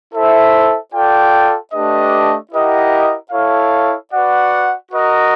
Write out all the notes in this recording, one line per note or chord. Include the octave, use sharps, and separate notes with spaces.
E4 A4 C5 E5
F4 A4 D5 G5
A3 D4 G4 B4 D#5
E4 G4 A#4 D#5 F#5
E4 A4 C#5 F5
F#4 B4 D5 F#5
F#4 A#4 D#5